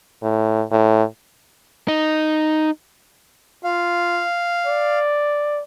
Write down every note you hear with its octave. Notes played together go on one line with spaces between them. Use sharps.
A2
A2
D#4
F4 F5
D5